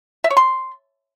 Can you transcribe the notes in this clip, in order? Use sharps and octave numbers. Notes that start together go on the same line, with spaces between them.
E5
C#5
C6